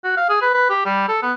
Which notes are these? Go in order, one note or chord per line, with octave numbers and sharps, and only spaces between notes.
F#4
F5
G#4
B4
B4
G4
G3
A4
B3